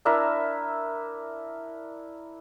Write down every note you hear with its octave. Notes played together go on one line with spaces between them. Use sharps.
D4 E4 A#4 E5